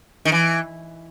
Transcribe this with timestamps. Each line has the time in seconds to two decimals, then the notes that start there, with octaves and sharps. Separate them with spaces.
0.25 D#3
0.32 E3